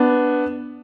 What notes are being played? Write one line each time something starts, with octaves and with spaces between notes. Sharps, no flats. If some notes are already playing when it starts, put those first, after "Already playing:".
Already playing: B3 D4